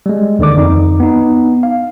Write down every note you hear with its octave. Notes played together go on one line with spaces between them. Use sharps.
G3 G#3
D#2 D3 D#3 D5 D6
F2 D#4
B3 D#4
F5